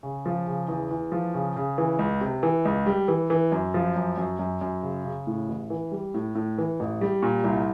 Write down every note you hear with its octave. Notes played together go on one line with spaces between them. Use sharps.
C#3
F3
C#3
E2
E2
F3
C#3
C#3
E3
C#2
C3
E3
C#2
G3
E3
E3
F#2
F3
F#2
F#2
F#2
F#2
C#3
C#3
A2
A1
E3
G3
A2
A2
E3
A1
G3
A#2
C2